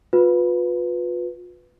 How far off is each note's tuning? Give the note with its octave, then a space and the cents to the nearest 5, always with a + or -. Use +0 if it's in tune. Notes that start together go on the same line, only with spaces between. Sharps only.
F4 +35 B4 +0